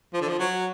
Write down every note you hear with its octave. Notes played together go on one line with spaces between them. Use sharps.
F3
D3
F3
F#3